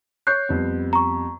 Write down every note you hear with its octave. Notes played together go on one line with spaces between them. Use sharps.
C#5 C#6 F#6 G6 C7
F2 G3 B3
A#5 C#6